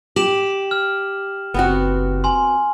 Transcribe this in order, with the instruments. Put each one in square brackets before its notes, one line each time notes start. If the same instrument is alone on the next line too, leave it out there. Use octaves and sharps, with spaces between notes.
[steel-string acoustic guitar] G4 [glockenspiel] E7 F#7
[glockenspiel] F6
[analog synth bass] F#1 [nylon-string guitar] B3 C4 F#4
[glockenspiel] G#5 C6